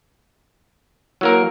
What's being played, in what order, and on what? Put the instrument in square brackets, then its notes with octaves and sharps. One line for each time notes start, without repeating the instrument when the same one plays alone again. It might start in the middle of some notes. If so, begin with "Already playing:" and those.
[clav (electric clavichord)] F#3 A#3 A#4 [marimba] E4